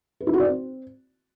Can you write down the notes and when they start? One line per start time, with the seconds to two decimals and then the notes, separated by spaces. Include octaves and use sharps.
0.21 B4
0.27 E4
0.33 F#4
0.40 D5
0.46 C4